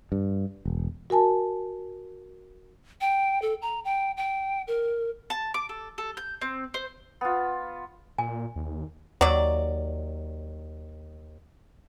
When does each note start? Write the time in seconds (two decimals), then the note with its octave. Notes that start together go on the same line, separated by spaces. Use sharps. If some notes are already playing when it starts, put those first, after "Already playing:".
0.12 G2
0.65 E1
1.10 F#4 A#4 G#5 A5
3.01 G5
3.42 A4
3.62 A#5
3.85 G5
4.17 G5
4.67 A#4
5.30 A5
5.54 D6
5.69 A4
5.98 A4
6.17 G6
6.41 C4
6.74 C5
7.21 B3 F4
8.18 A#2 G#5
8.56 D#2
9.21 D#2 F#3 D5